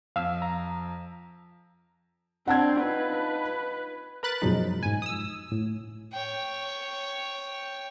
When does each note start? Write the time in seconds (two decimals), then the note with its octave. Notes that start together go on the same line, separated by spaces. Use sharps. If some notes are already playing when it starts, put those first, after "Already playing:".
0.16 F2 F5 E6
0.42 A#5
2.47 C4 D4 F#5 A5 G#6
2.82 D#4 F4 B4
4.23 A#4 B4 B5 F#6 A6
4.42 F#2 B2 F3 F#3 G#3 D#4
4.83 G#2 G#5
5.02 D#6 E6
5.52 A2
6.13 C#5 G5